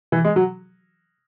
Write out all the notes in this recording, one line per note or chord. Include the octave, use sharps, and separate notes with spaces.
E3
G#3
F#3